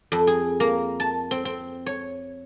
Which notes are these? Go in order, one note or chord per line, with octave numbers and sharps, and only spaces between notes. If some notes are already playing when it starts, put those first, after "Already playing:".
F2
G#4
A#3
A5
C4
C4
C#5